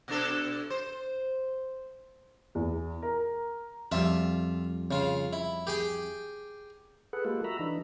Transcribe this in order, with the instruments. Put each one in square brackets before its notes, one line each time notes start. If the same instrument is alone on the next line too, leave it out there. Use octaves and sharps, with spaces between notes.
[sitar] B2 D4 A4
C5
[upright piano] E2
A#4
[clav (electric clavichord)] F2 G3 [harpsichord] F4 E5
[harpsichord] C#3 F4
E4
G4 G#4 G5
[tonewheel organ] G#4 A4 B4 F#5
G#3 A#3 F4 G4 A4
F#4 E5 A#5 B5
E3 D4 D#4